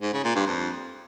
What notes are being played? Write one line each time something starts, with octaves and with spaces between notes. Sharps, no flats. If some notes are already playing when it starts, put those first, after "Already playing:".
G#2
C#3
A#2
G2
F2